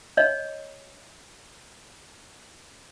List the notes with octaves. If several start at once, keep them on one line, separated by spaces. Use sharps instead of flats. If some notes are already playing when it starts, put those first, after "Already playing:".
C#5 D#5